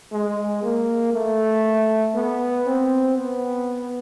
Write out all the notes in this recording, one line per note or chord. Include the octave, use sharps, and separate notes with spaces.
G#3
A#3
A3
B3
C4
B3